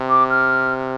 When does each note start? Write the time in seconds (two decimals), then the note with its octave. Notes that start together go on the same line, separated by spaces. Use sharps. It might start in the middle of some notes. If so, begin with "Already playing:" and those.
Already playing: C3
0.09 D6
0.30 F6